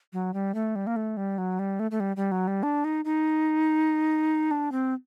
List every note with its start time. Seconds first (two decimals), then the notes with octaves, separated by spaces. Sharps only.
0.13 F#3
0.34 G3
0.55 A3
0.76 G3
0.87 A#3
0.96 A3
1.17 G3
1.38 F#3
1.59 G3
1.80 A3
1.91 A3
2.00 G3
2.16 G3
2.32 F#3
2.47 G3
2.63 D4
2.85 D#4
3.05 D#4
4.51 D4
4.72 C4